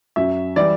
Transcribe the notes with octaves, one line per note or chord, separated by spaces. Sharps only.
F#2 F#3 E5
E3 G3 D5